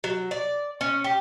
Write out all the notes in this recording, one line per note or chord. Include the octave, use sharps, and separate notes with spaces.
F#3
D5
C#4
G4